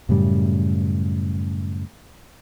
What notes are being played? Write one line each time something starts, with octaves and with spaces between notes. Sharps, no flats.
F#2 A2 C#3 G3